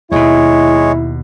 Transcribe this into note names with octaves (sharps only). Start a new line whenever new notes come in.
D#2 B2 G#3 E4 C#5